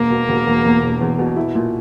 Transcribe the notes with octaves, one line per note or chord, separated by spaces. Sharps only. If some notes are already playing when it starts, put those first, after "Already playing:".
Already playing: E1 A#3
B2
E1
E2
E2
E1
E2
B2
E4
A#2